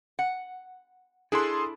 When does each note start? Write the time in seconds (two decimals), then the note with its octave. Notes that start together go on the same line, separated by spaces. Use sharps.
0.19 F#5
1.32 D4 E4 G#4 A4 C6